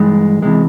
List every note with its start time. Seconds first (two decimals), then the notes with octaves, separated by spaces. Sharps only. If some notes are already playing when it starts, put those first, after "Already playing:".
Already playing: G2 E3 G#3
0.42 E2 C3 E3 G#3